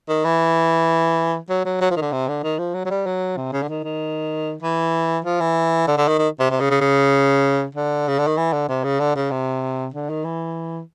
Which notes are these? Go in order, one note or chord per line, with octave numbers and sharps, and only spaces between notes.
D#3
E3
F#3
F#3
F#3
F3
D#3
D3
C3
D3
D#3
F3
F#3
F#3
G3
F#3
C3
C#3
D3
D#3
D#3
E3
F3
E3
D3
D3
D#3
D#3
C3
C3
C#3
C#3
C#3
D3
C#3
D3
D#3
E3
D3
C3
C#3
D3
C#3
C3
D3
D#3
E3